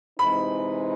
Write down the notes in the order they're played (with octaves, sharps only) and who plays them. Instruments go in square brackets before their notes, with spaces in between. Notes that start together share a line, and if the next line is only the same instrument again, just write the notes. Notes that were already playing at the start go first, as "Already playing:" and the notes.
[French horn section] C3 E3 G#3 C4 D#4 [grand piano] B5